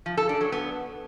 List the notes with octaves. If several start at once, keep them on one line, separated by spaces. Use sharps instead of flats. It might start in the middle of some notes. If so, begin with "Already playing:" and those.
F3
A4
D4
F#3
B3